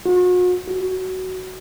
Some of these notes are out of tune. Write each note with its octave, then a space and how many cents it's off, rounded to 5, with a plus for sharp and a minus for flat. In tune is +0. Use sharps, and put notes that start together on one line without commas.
F#4 -40
F#4 +15